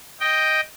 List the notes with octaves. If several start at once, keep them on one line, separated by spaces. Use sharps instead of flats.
D#5 G5